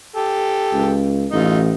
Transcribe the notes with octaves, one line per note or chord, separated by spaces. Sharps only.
G4 A4
C#2
A1 D#4 F4